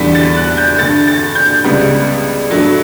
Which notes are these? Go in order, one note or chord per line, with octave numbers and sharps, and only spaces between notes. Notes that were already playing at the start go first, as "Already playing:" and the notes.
Already playing: E2 D3 G3 B6
A6
F#6
G6
G2 D3 A3 A6
A6
G6
C#2 C#3 G3 B3
G2 F#3 A3